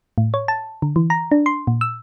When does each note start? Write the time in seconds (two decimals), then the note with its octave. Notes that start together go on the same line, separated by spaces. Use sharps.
0.18 A2
0.34 C#5
0.48 A5
0.82 D3
0.96 E3
1.10 A#5
1.31 D4
1.46 C6
1.67 A#2
1.81 E6